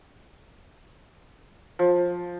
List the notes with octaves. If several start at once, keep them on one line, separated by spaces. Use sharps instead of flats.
F3